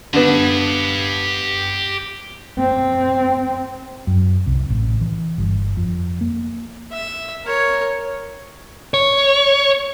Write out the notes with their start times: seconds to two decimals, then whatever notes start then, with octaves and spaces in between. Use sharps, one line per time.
0.14 D3 B3 G4 A5
2.59 C4
4.07 F#2
4.46 C2
4.70 A1
5.01 E3
5.38 G1
5.77 F2
6.21 A#3
6.92 E5
7.44 A#4 C#5
8.94 C#5